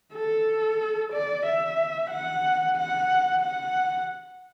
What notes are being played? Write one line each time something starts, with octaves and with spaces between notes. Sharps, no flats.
A4
D5
E5
F#5
F#5
F#5